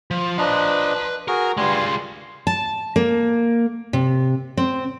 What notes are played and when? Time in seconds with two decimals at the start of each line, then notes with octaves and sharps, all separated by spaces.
0.11 F3
0.39 F3 D4 B4 D#5 A#5
1.28 F#4 G#4 A#4
1.57 G2 G3 G#3 F4 G#5
2.47 A5
2.96 A#3
3.93 C3
4.57 C4